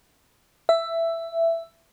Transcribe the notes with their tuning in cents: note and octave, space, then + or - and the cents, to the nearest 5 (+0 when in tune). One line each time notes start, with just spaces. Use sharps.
E5 +10